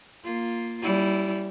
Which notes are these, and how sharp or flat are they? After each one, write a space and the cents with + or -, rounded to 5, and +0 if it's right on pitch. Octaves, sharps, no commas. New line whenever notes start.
A#3 +0 F4 +0
G3 -15 C#4 +20 E4 +0